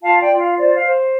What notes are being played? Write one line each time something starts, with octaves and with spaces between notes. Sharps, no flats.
F4 F5 A5
D5 G5
F4
F5
C5 D5
F5
C5